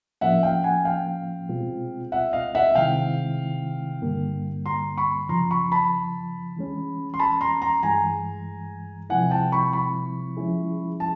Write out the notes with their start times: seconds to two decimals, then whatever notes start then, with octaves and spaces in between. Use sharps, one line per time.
0.21 A2 F3 A#3 C#4 E5 F#5
0.43 F5 G5
0.64 F#5 G#5
0.85 F5 G5
1.49 B2 G#3 C4 F4
2.12 E5 F#5
2.33 D#5 F5
2.55 E5 F#5
2.75 C3 D#3 G#3 C4 E4 F5 G5
4.02 G2 D3 G3 A#3
4.66 A#5 C6
4.97 B5 C#6
5.29 F#2 C#3 F3 A#5 C6
5.51 B5 C#6
5.72 A5 B5
6.57 E3 G#3 C#4
7.14 C6
7.19 A5 B5
7.41 A#5 C6
7.62 A#5 C6
7.83 G2 E3 G#3 G#5 A#5
9.10 C3 F3 G#3 C4 E4 F#5 G#5
9.31 G5 A5
9.52 B5 C#6
9.73 B5 C#6
10.37 F3 G#3 C#4 E4 G#4
11.00 A5